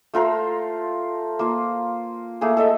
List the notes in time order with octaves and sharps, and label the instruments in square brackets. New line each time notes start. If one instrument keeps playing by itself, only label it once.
[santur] A3 F4 A#4 C5
A#3 F4
A3 A#3 G#4
A4 D#5 E5